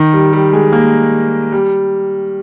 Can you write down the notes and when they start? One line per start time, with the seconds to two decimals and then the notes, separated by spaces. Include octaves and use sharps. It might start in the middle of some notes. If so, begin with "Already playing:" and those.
Already playing: D#3
0.13 G3
0.33 G3
0.53 G#3
0.73 A#3
1.52 G3